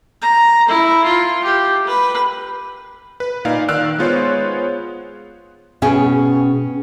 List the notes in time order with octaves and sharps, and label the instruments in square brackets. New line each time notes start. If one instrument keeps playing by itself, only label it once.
[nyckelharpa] A#5
E4
F4
G4
B4
[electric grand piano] B4
A#2 D#4 D5 F5
D#3 D5 F5 E6 F#6 D7
G#3 B3 F4 C5 C#5
[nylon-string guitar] B2 C#4 G#4 G5 G#5